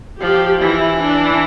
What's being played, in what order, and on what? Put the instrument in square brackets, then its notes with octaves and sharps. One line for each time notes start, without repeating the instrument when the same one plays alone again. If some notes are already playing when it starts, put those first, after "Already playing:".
[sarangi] F3 [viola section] G4
[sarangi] E3 [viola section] E4
[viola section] D4